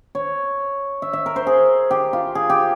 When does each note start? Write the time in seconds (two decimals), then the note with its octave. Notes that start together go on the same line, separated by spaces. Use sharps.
0.15 C#5
1.02 E5
1.13 E5
1.26 A#4
1.36 C5
1.47 G#4
1.91 G4
2.13 F4
2.35 G#4
2.50 G4